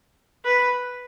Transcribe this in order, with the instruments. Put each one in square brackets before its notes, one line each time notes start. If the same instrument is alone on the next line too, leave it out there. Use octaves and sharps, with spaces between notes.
[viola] B4